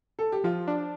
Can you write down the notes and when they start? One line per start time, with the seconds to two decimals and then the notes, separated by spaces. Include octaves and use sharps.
0.19 A4
0.32 G4
0.44 F3 F4
0.68 D4